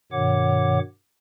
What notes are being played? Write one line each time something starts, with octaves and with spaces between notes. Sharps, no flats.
G2 B2 D#3 C#5 F#5 D6